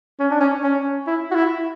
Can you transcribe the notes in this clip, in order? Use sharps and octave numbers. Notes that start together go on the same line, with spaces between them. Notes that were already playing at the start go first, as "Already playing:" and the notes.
C#4
D4
C#4
C#4
E4
F#4
E4